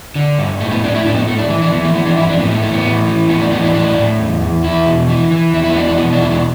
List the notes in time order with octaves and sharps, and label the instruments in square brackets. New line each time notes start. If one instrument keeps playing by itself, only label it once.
[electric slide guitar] D3
G2
A2 A3
B3
A2 D4
E4
A2 D4
B3
A2 A3
D4
E3 E4
D4
E3 B3
A3
E3 B3
D4
G2 E4
D4
A2 B3
A3
E3 A3
B3
A2
E3
A2 B3
D4
E3 B3
D4
A2 D4
A2
E2
E2
E2 E4
B2
E3
E3
E2 E4
E4
B3
E3 D4
D4
B2 B3
D4
E2 E4
D4